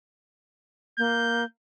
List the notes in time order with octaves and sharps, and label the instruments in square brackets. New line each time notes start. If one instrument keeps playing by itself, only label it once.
[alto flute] A#3 [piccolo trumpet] G6